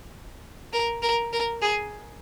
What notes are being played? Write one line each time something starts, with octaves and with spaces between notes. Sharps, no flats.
A#4
A#4
A#4
G#4